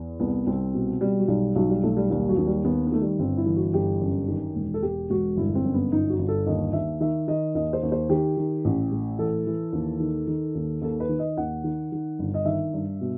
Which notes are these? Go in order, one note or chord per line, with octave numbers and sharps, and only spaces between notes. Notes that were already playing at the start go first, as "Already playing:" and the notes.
Already playing: E2
C2 B3
C2 C4
B2
B2 G3
F#3
B1 G3
B1 F#3
G3
B1 A3
G3
D#2 G3
F#3
D#2
G3
D#2 B3
B3
D#3 A3
G3
G1 C4
E4
E3
F#4
G1 G4
F#2
D#3
E1
A4
E1 G4
E1 F#4
G1 E4
C4
F#2
B3
G1 D#4
F#4
G1
A4
D#2 D#5
D#2 E5
D#3 E5
D#3 D#5
D#2 D#5
C5
D#2
C5
D#3 G4
D#3
A1
A2
E3 A4
E3
D#2
D#3
D#3
D#2
D#2 A4
B4
D#3
D#5
D#2 F#5
D#3
D#3
G1
D#5
D#3 E5
G2
B2